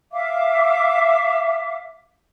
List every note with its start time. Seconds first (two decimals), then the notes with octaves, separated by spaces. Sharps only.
0.12 E5 F5 D6